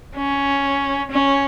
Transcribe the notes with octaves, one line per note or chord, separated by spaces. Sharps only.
C#4
C#4